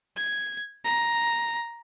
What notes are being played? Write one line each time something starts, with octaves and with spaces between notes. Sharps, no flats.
G#6
A#5